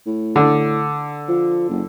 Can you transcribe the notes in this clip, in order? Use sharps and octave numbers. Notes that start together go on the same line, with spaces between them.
A2
D3
F3
F#1